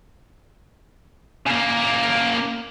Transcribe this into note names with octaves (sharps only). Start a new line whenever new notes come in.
C#3 A#3